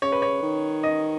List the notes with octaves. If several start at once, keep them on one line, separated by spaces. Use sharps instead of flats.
C#3 C#5
B4
C#5
D#3
D#5